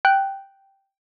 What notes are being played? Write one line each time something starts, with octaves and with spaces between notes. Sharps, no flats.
G5 F#6